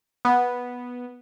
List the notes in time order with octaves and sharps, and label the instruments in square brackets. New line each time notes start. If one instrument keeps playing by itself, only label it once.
[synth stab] B3